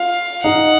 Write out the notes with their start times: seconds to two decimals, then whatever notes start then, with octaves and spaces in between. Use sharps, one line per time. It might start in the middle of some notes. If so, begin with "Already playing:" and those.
Already playing: F4 F5
0.44 D#4 F#5